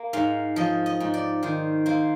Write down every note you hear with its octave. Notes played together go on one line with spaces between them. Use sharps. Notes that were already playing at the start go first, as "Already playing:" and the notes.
Already playing: A#3
G#2 F5
F3 D#5
D#5
G#2
D5
D#3 C5
A#3 C5